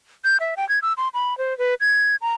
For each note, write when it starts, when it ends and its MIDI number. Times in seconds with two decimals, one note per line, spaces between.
0.25 0.37 91
0.40 0.55 76
0.57 0.68 79
0.69 0.79 92
0.82 0.93 88
0.97 1.08 84
1.14 1.37 83
1.38 1.57 72
1.58 1.74 71
1.81 2.16 92
2.21 2.34 82